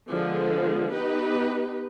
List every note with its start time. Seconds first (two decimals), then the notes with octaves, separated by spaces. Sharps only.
0.10 D3 F3 G#3 B3
0.92 B3 D#4 G4 B4